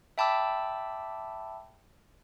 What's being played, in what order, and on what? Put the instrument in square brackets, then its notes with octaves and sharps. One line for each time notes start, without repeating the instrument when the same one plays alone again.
[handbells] E5 G5 A5 B5 D6 E6